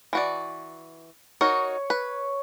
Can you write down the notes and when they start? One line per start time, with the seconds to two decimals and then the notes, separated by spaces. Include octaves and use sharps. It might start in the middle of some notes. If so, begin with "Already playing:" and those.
0.13 E3 F#4 D5
1.41 D#4 F#4 A#4 C#5
1.90 B4